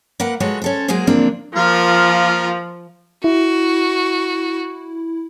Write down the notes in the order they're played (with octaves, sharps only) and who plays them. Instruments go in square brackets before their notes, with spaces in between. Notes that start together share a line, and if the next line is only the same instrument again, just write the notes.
[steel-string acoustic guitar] A#3 A#4 B4 F#5
F3 G#3 F#4 A4 B4 C#5
C#4 A4 C5
F#3 G#3 A#3 G#4 C5
D3 E3 F3 A#3 C4 D4
[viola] F3 [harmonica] A#3 F4 A#4
[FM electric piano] E4 [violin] F#4